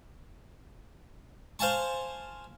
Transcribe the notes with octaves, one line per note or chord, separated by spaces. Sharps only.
C5 F5 G#5 A5 C#6